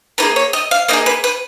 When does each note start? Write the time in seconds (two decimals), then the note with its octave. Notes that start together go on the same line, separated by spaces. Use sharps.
0.18 A#3 D#4 B4
0.22 G#4
0.36 C#5
0.53 D#5
0.71 F5
0.88 A#3 D#4 D#5
0.93 G#4
1.06 B4
1.24 B4